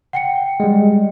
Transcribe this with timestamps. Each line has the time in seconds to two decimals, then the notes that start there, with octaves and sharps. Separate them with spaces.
0.13 F#5 G5 C#7
0.60 G3 G#3